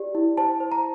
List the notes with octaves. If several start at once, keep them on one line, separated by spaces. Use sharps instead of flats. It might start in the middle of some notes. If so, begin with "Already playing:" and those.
Already playing: G4 D5
E4
C5 A5
C5
A#5